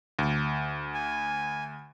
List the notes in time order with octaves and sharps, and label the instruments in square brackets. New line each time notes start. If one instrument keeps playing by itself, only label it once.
[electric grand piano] D2
[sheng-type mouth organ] G#5